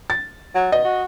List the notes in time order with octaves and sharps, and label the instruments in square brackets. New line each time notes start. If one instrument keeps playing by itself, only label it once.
[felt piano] A6
[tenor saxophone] F#3
[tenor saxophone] B2 [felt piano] D#5
[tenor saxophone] F#4